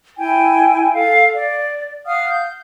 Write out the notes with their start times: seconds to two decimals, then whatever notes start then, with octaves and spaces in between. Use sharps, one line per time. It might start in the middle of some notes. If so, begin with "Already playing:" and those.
0.18 E4 G5 G#5
0.93 A4 F5
1.35 D5
2.06 F5 F#5 D#6 F6
2.30 G6